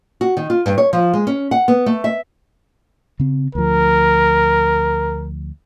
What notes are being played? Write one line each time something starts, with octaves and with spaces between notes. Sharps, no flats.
F#4
D#3
F4
G2
C#5
F3
G#3
C#4
F#5
B3
A3
E5
C#3 C4
D2 F3 A#4